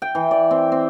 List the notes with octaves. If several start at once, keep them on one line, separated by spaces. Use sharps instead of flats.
G5
E3
D5
C4
C4